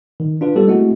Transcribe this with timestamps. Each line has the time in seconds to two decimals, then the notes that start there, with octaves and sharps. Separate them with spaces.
0.20 D#3
0.41 D4 F4 B4
0.55 G3 B3 G4 A4
0.68 G#3 A3 C4 E4 F#4